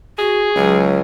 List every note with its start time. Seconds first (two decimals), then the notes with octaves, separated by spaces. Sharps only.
0.18 F#4 G#4
0.56 C#2 F#3